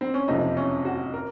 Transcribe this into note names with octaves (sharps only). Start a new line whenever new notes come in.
C4
C#4
F#1 F2 C3 F3 D#4
C#4
F#4
A#4